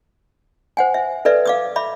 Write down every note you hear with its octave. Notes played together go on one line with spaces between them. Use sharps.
C5 F#5 G#5
E5
A4 B4 D5 E5
F5 D6 D#6
E5 B5 D6